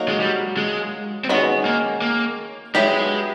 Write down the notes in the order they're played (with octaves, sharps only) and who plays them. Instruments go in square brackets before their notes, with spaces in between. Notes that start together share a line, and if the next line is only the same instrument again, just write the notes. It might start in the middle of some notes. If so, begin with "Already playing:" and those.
Already playing: [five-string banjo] F#3 A#3 D#4 F#4
[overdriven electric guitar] G#3
G3
G#3
C4
[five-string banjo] D#3 G#3 C#4 F#4 [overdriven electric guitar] B3
[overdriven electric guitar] A#3
A#3
[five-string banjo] F#3 B3 E4 G4 [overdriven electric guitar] G#3